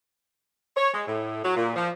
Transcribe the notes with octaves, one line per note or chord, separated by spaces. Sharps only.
C#5
G#3
A2
F#3
A#2
F3